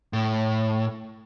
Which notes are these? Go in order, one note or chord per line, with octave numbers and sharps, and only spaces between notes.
A2